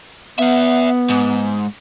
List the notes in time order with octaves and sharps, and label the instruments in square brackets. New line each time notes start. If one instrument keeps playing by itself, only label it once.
[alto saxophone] B3 [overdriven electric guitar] E5 F#5
[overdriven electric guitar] G#2